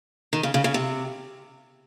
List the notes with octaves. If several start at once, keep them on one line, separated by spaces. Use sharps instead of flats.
D#3
C#3
C#3
C#3
C3